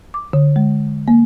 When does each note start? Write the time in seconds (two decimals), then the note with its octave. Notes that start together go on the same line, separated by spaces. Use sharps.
0.14 D6
0.33 D3
0.56 G#3
1.08 A#3